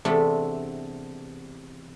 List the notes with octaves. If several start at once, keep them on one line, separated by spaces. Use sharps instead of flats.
E2 C3 A3 D4 G4